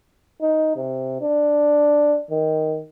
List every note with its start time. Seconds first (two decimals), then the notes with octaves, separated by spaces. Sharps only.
0.41 D#4
0.76 C3
1.21 D4
2.31 D#3